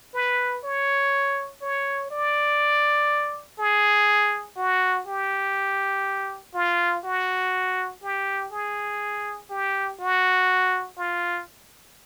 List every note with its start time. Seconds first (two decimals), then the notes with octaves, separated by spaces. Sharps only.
0.14 B4
0.64 C#5
1.62 C#5
2.11 D5
3.59 G#4
4.57 F#4
5.07 G4
6.54 F4
7.04 F#4
8.03 G4
8.52 G#4
9.50 G4
9.99 F#4
10.97 F4